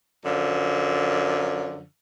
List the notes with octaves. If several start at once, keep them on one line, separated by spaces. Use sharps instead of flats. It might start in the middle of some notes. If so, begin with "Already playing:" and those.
F#2 D3 F3